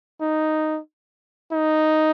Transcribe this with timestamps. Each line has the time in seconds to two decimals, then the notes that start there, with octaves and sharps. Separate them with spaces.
0.21 D#4
1.52 D#4